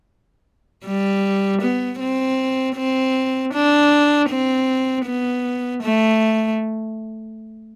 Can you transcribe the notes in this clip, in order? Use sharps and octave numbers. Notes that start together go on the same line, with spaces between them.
G3
B3
C4
C4
D4
C4
B3
A3